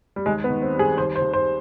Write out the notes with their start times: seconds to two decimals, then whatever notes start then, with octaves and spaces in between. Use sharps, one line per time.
0.16 G3
0.26 D#2 G#3
0.44 B3
0.50 D#3
0.62 C4
0.74 G3
0.79 G#4
0.98 D#2 C5
1.16 C5
1.22 D#2
1.33 C5